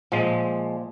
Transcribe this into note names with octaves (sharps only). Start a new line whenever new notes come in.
A#2 F3 G#3